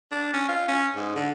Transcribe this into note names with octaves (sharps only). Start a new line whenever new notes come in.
D4
C#4
F4
C#4
G#2
D3